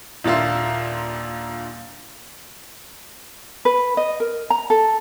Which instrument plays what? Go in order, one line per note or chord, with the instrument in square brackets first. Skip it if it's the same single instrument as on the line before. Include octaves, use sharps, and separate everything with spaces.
[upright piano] D#1 A#2 D4 F4 E5
[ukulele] B4
D#5
A#4
A#5
A4